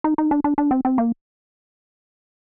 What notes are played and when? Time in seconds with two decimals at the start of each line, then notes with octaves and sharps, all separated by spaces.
0.04 D#4
0.18 D#4
0.31 D4
0.44 D4
0.58 D4
0.71 C4
0.85 C4
0.98 A#3